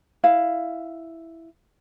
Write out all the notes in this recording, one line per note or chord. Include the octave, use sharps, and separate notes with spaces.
E4 F5